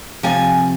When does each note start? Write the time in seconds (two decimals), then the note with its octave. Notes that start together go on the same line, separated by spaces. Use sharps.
0.23 C3 F3 G#5